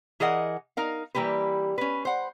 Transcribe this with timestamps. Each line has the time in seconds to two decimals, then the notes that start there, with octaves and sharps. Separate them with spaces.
0.20 E3 G#4 A#4 D#5 F#5
0.77 D#4 A#4 F5
1.15 E3 G3 A#3 G4 B4
1.78 C#4 B4
2.05 C5 F#5